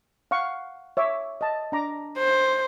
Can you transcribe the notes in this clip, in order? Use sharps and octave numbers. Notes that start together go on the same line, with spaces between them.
F5 F#5 C#6
C#5 E5 D6
D#5 A5
D4 A#5 D6
C5